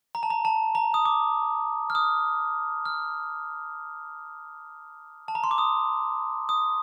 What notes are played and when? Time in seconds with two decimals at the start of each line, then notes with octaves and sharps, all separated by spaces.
0.15 A#5
0.23 A5
0.30 A#5
0.45 A5
0.75 A#5
0.94 D#6
1.06 D6
1.90 F6
1.95 D#6
2.86 F6
5.28 A5
5.35 A#5
5.44 C6
5.51 D6
5.58 D#6
6.49 D#6